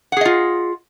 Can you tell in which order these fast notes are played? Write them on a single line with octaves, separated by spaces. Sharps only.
F#5 G#4 D#5 F4